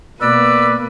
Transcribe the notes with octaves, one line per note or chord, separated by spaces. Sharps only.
B2 A#3 B4 D5 E6